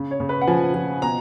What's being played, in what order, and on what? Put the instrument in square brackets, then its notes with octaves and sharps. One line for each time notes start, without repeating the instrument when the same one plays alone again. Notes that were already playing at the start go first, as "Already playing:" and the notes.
Already playing: [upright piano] C#3
C#5
C#3
B4
F#5
F3 G#5
F3
B2 A#5